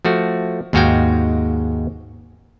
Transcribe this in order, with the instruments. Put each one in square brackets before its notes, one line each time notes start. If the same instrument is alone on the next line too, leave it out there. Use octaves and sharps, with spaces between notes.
[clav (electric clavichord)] F3 A3 F#4
D#2 G#2 G#3 F#4 F5 G5